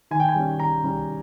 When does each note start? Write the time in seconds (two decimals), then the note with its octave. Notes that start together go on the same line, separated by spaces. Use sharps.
0.11 D#3 G#5
0.20 G5
0.29 G#5
0.35 G3 C#4
0.59 D#3 A#5
0.84 G3 C#4